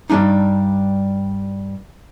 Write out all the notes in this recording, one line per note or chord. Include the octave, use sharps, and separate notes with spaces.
G2 G3 G#3 D4 D#4